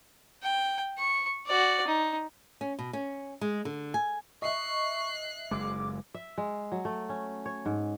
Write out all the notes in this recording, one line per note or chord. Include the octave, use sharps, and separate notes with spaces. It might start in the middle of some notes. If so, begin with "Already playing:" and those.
G5
C#6
F#4 D5
D#4
C#4
B2
C#4
G#3
D3
G#5
D#5 E5 C#6 F#6 C7
F#1 G#3 D6
E5
G#3
F#3
A3
C#4
C#5
G#2